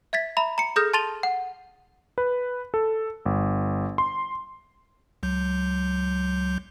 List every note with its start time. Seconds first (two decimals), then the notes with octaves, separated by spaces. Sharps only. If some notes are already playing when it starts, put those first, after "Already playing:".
0.13 E5 G#6 A6 B6
0.37 E5 A#5 B5
0.58 A#5 C#7
0.76 G#4 A4 D#6 F6 G6 A#6
0.94 A5 C6 A6 D#7 F7 G7
1.23 F#5
2.18 B4
2.74 A4
3.26 G1
3.98 C6
5.23 C#2 F#3 G6